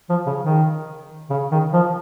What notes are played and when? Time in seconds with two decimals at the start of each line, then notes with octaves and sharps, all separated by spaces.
0.10 F3
0.26 C#3
0.42 D#3
1.30 C#3
1.51 D#3
1.73 F3